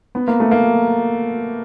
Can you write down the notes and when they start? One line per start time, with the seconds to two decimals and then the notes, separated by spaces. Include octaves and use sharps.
0.15 B3
0.28 A#3
0.40 A3
0.51 A#3